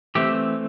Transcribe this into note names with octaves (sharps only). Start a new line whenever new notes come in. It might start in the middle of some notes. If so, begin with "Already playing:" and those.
E3 A3 C4 G4